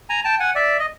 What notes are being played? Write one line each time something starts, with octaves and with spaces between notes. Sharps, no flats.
G#5 A#5
G5 A5
F#5 G#5
D5 E5
D#5